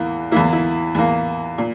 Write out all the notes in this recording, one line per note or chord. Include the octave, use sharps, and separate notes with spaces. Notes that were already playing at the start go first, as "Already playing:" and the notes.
Already playing: E2 E3 A#3
E2 E3 A#3 E4
E4
E2 E3 A#3
A#2